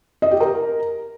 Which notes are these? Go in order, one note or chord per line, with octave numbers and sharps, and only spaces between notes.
D#5
G4
A#4